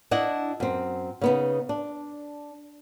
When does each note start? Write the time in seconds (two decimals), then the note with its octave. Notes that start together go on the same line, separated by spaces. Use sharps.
0.11 D4 E4 D#5 F#5
0.60 F#2 C4
1.21 C#3 B3 D#4
1.69 D4